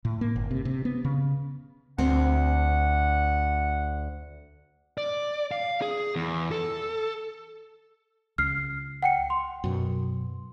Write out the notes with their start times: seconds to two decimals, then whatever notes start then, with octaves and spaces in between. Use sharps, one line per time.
0.05 A2
0.21 A#3
0.36 G1
0.51 C3
0.65 C3
0.85 B3
1.05 C#3
1.98 D2 C4 F#5
4.98 D5
5.52 F5
5.82 G#4
6.16 E2
6.51 A4
8.38 C#2 F6 C7
9.03 F#5 G5 C#7
9.30 C6
9.64 F#2 B2